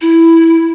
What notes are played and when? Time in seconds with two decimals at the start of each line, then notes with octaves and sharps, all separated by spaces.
0.01 E4